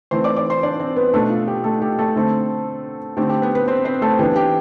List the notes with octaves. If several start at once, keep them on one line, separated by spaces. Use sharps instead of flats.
E3 A3 C4 C5 C6
D5 D6
D5 D6
C5 C6
D4 D5
C4 C5
B3 B4
B2 A3 D4 A4
F4
G4
A3 A4
G4
A3 A4
D3 A3 C4
D3 A3 C4 G4
G4
B3 B4
B3 B4
C4 C5
C4 C5
A3 A4
E3 B3 D4 G4
G4